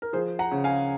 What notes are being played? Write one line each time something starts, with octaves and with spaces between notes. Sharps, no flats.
A#4
F3 G#4 C5
F#5 A#5
C#3
F5 G#5